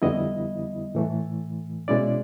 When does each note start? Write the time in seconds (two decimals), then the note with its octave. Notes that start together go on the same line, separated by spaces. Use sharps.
0.02 F2 D3 G3 B3 E4 D#5
0.95 A2 E3 A3
1.88 B2 G#3 C#4 E4 D5